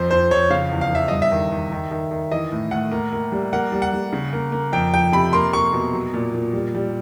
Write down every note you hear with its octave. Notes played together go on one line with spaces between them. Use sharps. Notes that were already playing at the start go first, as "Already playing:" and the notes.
Already playing: F2 C5
F2 C5
F2 C#5
C#3 F5
E2
F5
E2 E5
G2 D#5
E5
D#3
D#3
D#3
D#3
D#3
E3 D#5
A2
A2 F#5
A#3
A#3
G3
A#3 F#5
G3
F#5
G3
C#3
A#3
A#3
F2 G5
F2 G5
C3 B5
A#3 C6
A#3 C#6
B2
F#3
A#2
A#2
G3
G3